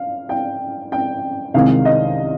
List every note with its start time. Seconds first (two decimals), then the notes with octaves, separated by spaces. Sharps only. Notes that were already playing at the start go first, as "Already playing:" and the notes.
Already playing: F5
0.29 G5
0.92 G5
1.54 C2 C3 D#3 G#3 F5
1.85 D#5